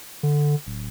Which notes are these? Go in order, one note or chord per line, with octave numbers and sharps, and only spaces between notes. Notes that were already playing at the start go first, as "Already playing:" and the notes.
D3
D1